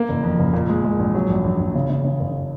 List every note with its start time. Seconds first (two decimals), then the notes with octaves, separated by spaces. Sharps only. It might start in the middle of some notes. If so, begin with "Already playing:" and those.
Already playing: A#3
0.09 F#1
0.23 F2
0.39 F#1
0.53 A#2
0.69 G#3
0.85 G#3
0.99 A#1
1.15 F#3
1.30 A#1
1.44 A#1
1.59 A#1
1.75 C#3
1.90 C#3
2.04 C#3
2.20 F#1